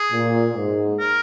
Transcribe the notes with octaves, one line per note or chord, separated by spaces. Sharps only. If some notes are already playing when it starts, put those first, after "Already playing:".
Already playing: G#4
A#2
G#2
A#4